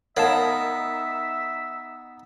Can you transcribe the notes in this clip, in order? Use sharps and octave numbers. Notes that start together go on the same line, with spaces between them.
B3 D#4 A#4 C#5 E5 F5 A5